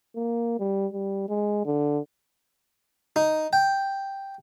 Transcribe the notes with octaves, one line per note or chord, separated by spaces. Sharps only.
A#3
G3
G3
G#3
D3
D#4
G5